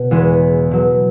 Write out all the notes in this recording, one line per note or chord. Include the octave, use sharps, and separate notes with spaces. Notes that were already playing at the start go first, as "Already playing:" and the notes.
Already playing: B2
E2 E3 G#3
B2 F#3